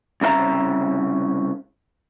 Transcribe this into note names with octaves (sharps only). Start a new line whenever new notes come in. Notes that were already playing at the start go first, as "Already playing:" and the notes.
C2 C#3 A#4 E5 A#5